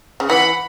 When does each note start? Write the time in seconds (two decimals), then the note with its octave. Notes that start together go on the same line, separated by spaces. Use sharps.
0.20 C#3
0.29 E3 F#5 B5